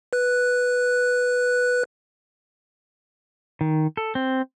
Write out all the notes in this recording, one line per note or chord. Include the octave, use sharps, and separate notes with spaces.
B4 F#6
D#3
A4
C4